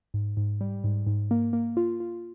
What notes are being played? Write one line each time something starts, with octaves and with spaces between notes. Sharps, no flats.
G#2
G#2
G3
G#2
G#2
A#3
A#3
F4
F4